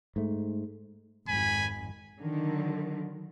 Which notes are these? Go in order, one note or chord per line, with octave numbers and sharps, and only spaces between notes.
G#2 A3
G#1 F2 G#2 G#5 B5
D3 D#3 F#3